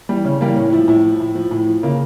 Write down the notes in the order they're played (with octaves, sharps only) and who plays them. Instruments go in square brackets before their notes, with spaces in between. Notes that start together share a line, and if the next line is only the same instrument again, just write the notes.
[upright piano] E3 G3
C#3 C#4
E3 G3 A#3
A2 C#4
F3 E4
A2 E4
F3
A2
F3
A2
F3
C#3 A#3